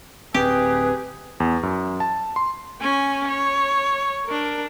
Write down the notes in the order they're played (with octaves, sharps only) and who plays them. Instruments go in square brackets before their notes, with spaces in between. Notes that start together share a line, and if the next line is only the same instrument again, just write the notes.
[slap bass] D1 C4 [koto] G4 [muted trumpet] G#4 [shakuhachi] B4
[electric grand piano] E2
F#2
A5
C6
[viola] C#4 G#5
C#5
D4 A#4